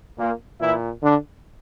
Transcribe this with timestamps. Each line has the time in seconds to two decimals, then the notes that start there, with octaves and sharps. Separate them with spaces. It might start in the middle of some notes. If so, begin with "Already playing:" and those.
0.18 A#2 A#3
0.59 A#2 E3 E4
1.02 D3 D4